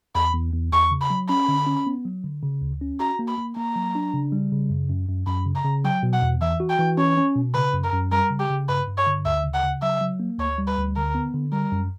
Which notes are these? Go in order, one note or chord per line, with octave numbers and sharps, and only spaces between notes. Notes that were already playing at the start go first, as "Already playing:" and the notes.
E2 B5
E2
E2
E2 C#6
C#3
B5
F#3
C#4 B5
D3
C#4
B3
F#3
D3
C#3
D2
C#4
F#4 A#5
A#3
B5
A#3
A#3 A#5
F#3
D4
C#3
G3
C#3
F#2
F#2
F#2
F#2 B5
C#3
A#5
C#3
F#3 G5
B2
F#5
E2
E3 E5
F#4
G5
E3
C#4 C#5
C#4
B2
C#3 B4
F#2
A#4
F#2
G3 A#4
C#3
G4
C#3
G2 B4
G2
C#5
D3
D2 E5
C#3
F#5
C#3
F#3 E5
F#3
A#3
D2 C#5
G3
B4
D2
D3 A#4
B3
D3
G3 A#4
F#2